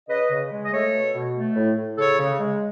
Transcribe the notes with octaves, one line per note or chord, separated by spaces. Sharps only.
C#3 B4 D#5
C#3
G#3
D#5
A3 A4 C#5
B2
B2
A3
A2
A2
C#3 A4 C#5
C#3
G#3